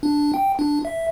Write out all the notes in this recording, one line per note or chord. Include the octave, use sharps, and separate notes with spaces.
D4
G5
D4
E5